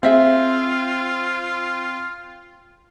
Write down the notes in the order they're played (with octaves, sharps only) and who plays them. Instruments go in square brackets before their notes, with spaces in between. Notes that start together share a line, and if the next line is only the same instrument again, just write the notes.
[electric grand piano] C4 [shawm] F4 [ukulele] G#4 E5 F5